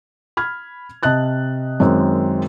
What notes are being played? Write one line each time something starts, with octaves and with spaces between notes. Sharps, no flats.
B5 F6 G#6
C3 D#5 A5 F#6 A6
F#2 D#3 G#3 C4